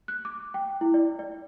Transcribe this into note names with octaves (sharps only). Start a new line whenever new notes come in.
F#6
D6
G5
E4
D5
D5